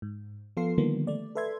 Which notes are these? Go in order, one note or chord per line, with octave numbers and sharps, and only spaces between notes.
G#2
F3 B3 A4 F5 C6 C7
D3 D#3 F3 G3 A#3 B3
A3 D5
A4 B4 E5 C6 G#6